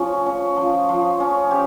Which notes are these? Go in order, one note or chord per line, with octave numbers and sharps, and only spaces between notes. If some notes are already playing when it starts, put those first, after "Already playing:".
Already playing: F3 C#4
C#4
F3
F3
C#4
G4